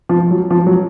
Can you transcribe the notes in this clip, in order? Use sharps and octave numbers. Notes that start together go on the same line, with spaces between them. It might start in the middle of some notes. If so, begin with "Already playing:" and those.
F3
F#3
F3
F#3